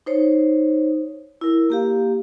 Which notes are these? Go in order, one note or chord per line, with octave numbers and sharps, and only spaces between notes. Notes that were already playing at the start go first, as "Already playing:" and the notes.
D#4 C5 C#5
E4 A#4
A#3 G4 F5